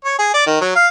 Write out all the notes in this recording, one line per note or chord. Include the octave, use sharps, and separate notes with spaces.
C#5
G#4
D5
D#3
F#3
F5